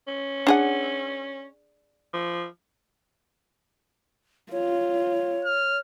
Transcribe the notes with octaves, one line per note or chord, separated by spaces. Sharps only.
C#4
D4 G#4 F#5
F3
F4 C#5
F6